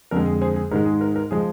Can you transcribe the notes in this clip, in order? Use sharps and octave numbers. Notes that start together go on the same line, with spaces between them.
F2 D3 G#3 A#4
G#4
G#4 C5
G#4
G#2 D#3 G#3 A#4
G#4
A#4
A#4
F3 G#3 G#4